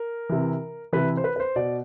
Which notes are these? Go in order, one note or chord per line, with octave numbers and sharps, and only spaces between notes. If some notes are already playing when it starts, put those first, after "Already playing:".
Already playing: A#4
C3 E3
C3 E3 B4
C5
B4
B4
C5
B2 D5